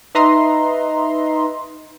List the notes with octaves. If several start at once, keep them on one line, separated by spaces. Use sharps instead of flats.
D#4 B4 D#5 E5 A#5 C6